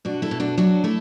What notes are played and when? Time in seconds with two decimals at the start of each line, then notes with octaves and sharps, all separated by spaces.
0.05 B2 D4 F#4
0.22 E4 A4
0.31 B2
0.40 D4 F#4
0.58 F#3 D4 F#4
0.84 A3 E4 A4